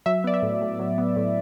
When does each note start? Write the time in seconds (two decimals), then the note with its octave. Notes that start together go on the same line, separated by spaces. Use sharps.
0.06 F#3 E5
0.24 B3 D5
0.34 E5
0.42 A2
0.61 A2
0.79 F#3
0.98 B3
1.16 A2